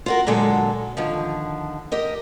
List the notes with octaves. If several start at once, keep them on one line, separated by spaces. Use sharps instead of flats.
F4 F#4 A#4
A#2 D3 F#3 G#3 A4
D3 D#3 F3
G4 A#4 D#5